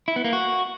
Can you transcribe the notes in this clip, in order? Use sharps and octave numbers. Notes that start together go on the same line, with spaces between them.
E4
B3
A#3
F#4